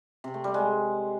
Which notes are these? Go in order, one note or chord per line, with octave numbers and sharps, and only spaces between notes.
C3
A3
G3
G#3